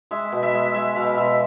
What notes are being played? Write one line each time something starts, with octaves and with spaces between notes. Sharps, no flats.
G#3 E5
B2
E5
G#3
G#3 E5
B2 F5
B2 E5